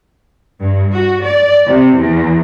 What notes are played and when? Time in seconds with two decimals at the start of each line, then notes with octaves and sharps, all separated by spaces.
0.60 G2
0.92 F#4
1.22 D5
1.67 C3
1.97 E2